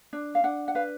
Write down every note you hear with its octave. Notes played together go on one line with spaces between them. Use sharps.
D4
F5
D4 F#5
F#5
B4 F5